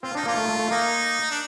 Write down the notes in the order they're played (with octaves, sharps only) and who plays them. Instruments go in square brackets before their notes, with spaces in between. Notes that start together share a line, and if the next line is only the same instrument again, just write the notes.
[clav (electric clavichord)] C4 [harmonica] F4
[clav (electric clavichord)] D4 [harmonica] D#4
[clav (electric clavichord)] A#3 [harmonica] F4
[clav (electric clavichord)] A3
A3
A3
[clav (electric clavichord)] A#3 [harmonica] D#4
[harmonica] D4